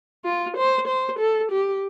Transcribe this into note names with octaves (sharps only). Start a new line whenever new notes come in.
F4
C5
C5
A4
G4